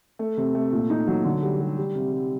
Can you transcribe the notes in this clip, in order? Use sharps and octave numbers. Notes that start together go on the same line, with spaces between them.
A3
C3
A3
A#2
D#4
F#3
D3
G3
G3
G3
C3
G3